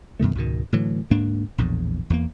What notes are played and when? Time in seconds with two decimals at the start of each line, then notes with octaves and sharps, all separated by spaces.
0.20 F#2 B2 D#3 A3
0.35 C#2 G#2 B2 D#3
0.73 A2 D3 E3 F#3
1.10 D2 G#2 A#3 D4
1.58 A#1 E2 A2
2.10 E2 G3 A#3